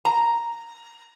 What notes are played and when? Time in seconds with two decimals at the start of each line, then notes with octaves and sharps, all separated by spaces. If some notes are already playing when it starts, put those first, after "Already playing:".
0.05 A#5